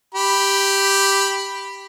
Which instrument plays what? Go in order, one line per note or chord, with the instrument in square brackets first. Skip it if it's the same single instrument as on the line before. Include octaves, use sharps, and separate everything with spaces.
[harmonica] G4 B5